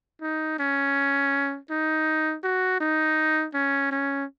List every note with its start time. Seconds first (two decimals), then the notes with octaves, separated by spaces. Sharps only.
0.22 D#4
0.59 C#4
1.70 D#4
2.44 F#4
2.80 D#4
3.54 C#4
3.91 C#4